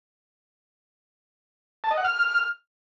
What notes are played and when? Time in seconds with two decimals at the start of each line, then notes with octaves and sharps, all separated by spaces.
1.84 A5
1.91 D#5
1.97 F#5
2.04 F6